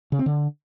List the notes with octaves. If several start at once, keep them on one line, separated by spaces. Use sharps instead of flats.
C#3
C4
D3